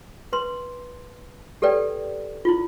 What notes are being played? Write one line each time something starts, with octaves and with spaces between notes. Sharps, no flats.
B4 C6
G4 A4 B4 D5 G5
E4 F4